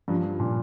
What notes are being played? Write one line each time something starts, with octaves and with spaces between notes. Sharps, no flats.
G2 F3 A#3 C#4 F4
A#2